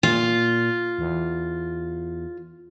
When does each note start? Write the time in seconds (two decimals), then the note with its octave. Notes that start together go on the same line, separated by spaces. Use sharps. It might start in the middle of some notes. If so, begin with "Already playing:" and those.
0.03 A#2 F4
0.99 E2